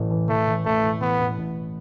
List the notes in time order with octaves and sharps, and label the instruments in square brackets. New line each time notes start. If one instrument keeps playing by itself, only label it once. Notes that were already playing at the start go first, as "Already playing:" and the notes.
Already playing: [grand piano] A1 A2 E3
E3
[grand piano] E3 [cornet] A3
[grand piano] E3
[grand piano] A1 [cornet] A3
[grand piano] A1
[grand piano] E3 [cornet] B3
[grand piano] A1
A1